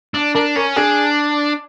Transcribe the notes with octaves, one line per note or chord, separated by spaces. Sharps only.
D4
D4 A#4
C#4 A#4
D4 G#4